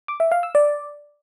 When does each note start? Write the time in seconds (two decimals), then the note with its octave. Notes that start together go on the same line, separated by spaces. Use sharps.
0.08 D6
0.20 E5
0.32 F5
0.43 E6
0.55 D5